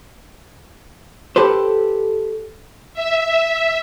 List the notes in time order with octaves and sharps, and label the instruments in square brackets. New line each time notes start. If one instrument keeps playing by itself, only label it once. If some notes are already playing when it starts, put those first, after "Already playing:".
[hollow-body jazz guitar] G4 A4 B4 C5
[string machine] E5